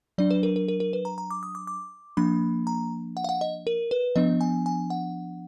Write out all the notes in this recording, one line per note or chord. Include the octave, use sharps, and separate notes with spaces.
F#3 D4 D5
B4
A#4
A#4
A#4
A#4
B4
A#5
A#5
D6
D#6
D6
D6
F3 A#3 D4 B5
A#5
F#5
F5
F#5
D#5
A#4
B4
F3 B3 D4 D#5
G#5
G#5
F#5